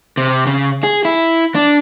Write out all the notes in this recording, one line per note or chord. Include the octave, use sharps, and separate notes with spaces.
C3
C#3
G#4
E4
D4